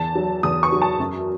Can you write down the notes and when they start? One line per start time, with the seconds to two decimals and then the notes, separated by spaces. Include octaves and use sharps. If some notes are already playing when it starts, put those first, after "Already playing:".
Already playing: E2 A5
0.15 F#3
0.43 E2 D#6
0.63 C#6
0.72 F#3
0.82 A5
1.00 F#2